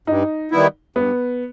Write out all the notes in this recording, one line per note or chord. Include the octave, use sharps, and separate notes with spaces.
G2 D#4
D#3 G3 B3 E4
G2 B3